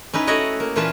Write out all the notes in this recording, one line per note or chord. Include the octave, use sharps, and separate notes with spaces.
C#4 D#4 E4 B4
A3 E4 F#4 C#5 D#5 F#5
A#3
A#2 E3 C#4 F4 B4 A5